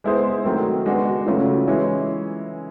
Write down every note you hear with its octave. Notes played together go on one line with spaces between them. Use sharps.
G#3 B3 E4 G#4 C5
D#3 F#3 A3 C4
G#3 B3 D4 F#4
C#3 F#3 A3 C#4 F4
E3 G#3 C#4 E4